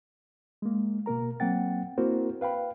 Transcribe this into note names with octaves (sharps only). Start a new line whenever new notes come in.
G#3 A#3
B2 A#3 A#4 A#5
F#3 A#3 C4 F#5 G5 A6
A#3 C4 E4 F#4 A#4 C5
B4 F5 G5 B5